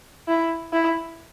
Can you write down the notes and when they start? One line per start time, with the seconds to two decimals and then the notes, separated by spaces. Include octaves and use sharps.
0.28 E4
0.73 E4